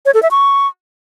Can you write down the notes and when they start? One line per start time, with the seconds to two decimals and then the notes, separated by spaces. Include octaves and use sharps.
0.06 C#5
0.14 A4
0.23 E5
0.31 C#6